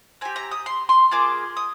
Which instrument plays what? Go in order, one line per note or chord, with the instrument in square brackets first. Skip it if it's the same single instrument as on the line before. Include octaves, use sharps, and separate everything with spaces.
[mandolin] C4 G4 G#5
A#5
D#6
C6
C6
A#3 F4 G#4 D6
D#6